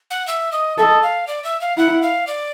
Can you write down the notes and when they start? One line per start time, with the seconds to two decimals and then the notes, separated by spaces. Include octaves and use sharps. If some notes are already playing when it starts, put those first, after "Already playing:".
0.11 F#5
0.27 E5
0.52 D#5
0.78 A4 E5
0.83 D#5
1.03 F5
1.27 D5
1.44 E5
1.61 F5
1.77 E4 F#5
2.02 F5
2.27 D5